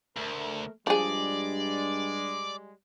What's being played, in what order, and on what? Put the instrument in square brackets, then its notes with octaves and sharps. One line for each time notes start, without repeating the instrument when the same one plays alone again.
[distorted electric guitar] D2 [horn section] A3 A#4
[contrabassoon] G2 [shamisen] F3 G#4 [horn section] G3 G#3 [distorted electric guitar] D5